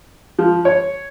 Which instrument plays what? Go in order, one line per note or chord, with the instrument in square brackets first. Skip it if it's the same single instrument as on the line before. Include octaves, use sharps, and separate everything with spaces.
[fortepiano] F3
C#5